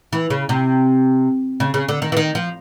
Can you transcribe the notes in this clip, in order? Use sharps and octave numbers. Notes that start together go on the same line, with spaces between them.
E3
C#3
C3
C#3
C#3
D3
D#3
E3
D#3
F3